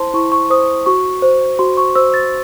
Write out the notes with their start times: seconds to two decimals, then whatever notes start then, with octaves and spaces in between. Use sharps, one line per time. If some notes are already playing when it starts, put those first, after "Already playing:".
Already playing: E4 C5 A5 C6
0.14 E4 C#6
0.32 C#6
0.50 C5 D#6
0.86 F#4 C#6
1.22 C5
1.59 F#4 C6
1.77 C#6
1.95 C5 E6
2.14 A6